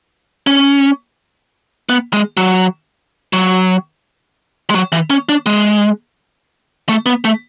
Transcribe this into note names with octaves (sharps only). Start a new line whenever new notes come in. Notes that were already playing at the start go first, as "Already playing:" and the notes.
C#4
B3
G#3
F#3
F#3
G#3
F#3
E3
C#4
D4
G#3
A3
B3
A3